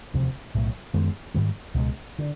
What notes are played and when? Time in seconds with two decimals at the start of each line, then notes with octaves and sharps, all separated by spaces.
0.14 E1 D2 C3 F3
0.54 B1 A2 F#3
0.94 F#2 D#3 G#3 B3
1.34 G#2 D#3 G3 A#3
1.74 C#2 B2 G#3
2.19 D3